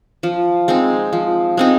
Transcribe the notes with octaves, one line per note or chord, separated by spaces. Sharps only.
F3
G#3 C4 D#4
F3
G#3 C4 D#4